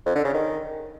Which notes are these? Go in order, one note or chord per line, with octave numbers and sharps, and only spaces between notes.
F2
D3
C#3
D#3